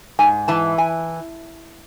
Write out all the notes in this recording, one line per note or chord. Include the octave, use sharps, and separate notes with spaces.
G#2 G#5
E3 A5
G#5